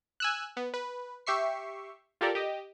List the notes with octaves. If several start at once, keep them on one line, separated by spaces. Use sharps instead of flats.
G#5 E6 F#6
B3
B4
G4 E5 C#6 C7
F4 G4 A4 A#4 D5
G4 D#5